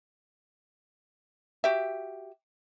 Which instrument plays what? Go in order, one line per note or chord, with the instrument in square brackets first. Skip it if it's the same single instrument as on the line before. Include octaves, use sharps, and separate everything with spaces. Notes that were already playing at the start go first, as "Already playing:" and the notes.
[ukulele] F#4 G4 E5